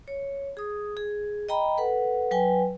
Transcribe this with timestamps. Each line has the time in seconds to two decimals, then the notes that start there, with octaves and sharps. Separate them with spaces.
0.08 C#5
0.57 G#4 D#6
0.97 G#4
1.49 D#5 G5 A#5 B5
1.77 A4 B4 F#5
2.31 F#3 B4 G5 G#5